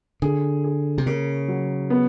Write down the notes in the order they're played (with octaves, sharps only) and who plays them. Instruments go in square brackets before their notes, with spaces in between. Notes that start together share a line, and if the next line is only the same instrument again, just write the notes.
[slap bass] D3 [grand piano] G#4
[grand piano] G#4
[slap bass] C3
[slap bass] C#3 [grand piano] A#3
[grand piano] F#3
B3